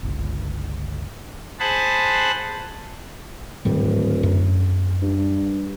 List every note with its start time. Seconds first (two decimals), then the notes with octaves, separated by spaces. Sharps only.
0.03 G1 C#2
1.60 G#4 C5 F#5 A5 B5
3.65 D1 G#2 D#3 G3
4.23 F#2
5.02 G2